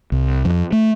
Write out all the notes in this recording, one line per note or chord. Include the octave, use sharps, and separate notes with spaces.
C2
F2
A3